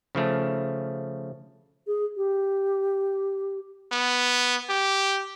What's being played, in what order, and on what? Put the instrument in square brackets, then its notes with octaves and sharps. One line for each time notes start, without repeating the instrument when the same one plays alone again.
[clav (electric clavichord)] C#3 F3 A3
[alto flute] G#4
G4
[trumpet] B3
G4